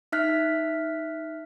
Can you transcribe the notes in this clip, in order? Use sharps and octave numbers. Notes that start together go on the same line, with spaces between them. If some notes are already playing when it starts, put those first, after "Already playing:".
D#4 E5 F6 F#6 B6